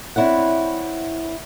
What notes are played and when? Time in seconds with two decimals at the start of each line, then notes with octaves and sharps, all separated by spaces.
0.16 C4 D4 E4 C#5 F#5